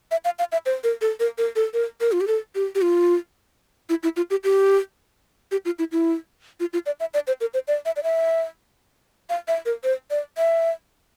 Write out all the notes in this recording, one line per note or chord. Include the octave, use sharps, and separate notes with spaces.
E5
F5
F5
E5
C5
A#4
A4
A#4
A#4
A4
A#4
A#4
F4
G4
A4
G4
G4
F4
E4
E4
F4
G4
G4
G4
F4
E4
E4
F4
F4
D5
E5
D5
C5
A#4
C5
D5
E5
D5
E5
F5
E5
A#4
C5
D5
E5